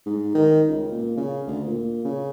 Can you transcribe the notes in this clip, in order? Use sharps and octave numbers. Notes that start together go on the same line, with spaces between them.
G#2
D#3
C#2
A#2
C#3
D2
A#2
C#3